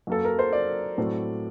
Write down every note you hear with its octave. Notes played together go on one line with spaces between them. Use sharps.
F#2 F#3 A#3 A4
A#4
C5
D5
A2 F#3 A3 C4